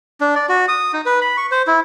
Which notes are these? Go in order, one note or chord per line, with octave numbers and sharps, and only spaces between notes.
D4
D5
F#4
D#6
D#4
B4
B5
C#6
C5
E4